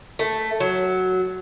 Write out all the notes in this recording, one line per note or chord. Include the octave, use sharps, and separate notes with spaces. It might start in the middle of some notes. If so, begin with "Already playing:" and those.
A3
F#3